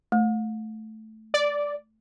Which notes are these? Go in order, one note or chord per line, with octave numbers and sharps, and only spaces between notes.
A3
D5